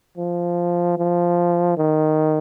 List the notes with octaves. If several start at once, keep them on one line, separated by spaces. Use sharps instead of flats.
F3
F3
D#3